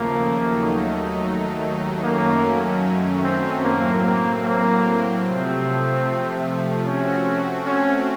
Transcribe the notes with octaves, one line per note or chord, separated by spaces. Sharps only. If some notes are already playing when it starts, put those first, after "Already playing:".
Already playing: D#2 C#3 F3 A3 A#3
D#2 D#3 F#3 A3 D#4
F#2 D#3 F#3 A3 A#3 C#4
C4
A2 F#3 A#3 C4
A#3
A#3
C3 F3 A3 C4
A3 C4 C#4 F#4
C#4